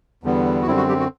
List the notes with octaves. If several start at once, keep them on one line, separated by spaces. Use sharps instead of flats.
E2 D3 G3 B3
F#4
F#2 D3 G3 C4 E4
F#4
G3 G4
F#4